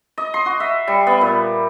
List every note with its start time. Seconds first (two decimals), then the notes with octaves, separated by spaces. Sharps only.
0.18 D#5
0.34 C6
0.46 F#4
0.60 E5
0.88 G3
1.07 B3
1.21 A#2